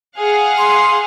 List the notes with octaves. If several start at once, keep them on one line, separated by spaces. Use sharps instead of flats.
G#4 F5 F#5
C6